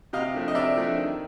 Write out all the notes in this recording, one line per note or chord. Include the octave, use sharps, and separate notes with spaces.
C3 D#5 F5
F3 A3 D4
D#5
C3 D5 E5
F3 A3 D4
D#3